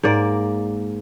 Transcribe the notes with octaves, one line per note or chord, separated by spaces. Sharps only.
G#2 A#3 D5